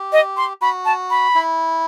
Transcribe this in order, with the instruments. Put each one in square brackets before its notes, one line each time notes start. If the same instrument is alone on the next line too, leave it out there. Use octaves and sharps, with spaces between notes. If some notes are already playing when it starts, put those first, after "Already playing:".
Already playing: [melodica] G4
[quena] D#5
C6
[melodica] F#4 [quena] B5
[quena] A5
B5
[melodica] E4